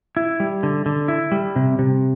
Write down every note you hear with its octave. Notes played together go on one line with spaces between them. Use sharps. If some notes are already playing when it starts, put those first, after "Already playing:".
E4
G3
D3
D3
E4
G3
C3
C3